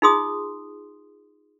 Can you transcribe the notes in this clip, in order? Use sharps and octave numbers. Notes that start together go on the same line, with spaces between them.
D#4 F4 G#4 C6 D#6